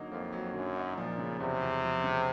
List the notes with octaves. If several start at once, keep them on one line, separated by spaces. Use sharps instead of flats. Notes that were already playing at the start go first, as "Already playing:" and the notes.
Already playing: D3 F#3 A#3 D#4
F2 A#3
F#3
F#2 D3
D#4
A#2 F3
C#3
E2 C3
E2
F3
C#3